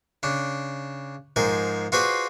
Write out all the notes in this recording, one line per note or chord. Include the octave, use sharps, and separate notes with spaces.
C#3 D4
G#2 F3 G#4 A#4
F4 F#4 G#4 B4 C5 D5